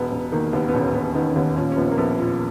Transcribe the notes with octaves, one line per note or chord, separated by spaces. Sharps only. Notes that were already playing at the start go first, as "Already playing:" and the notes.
Already playing: E1 B3
E1
D#3 A#3
D#2 B3
B3
E1 C#4
E1 B3
D#3 B3
C#4
D#2 B3
A#2 C#4
C#4
A#1 B3
A#3
A#1 B3
A#2